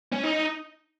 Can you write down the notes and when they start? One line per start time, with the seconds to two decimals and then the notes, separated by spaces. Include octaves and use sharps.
0.12 C#4
0.23 D#4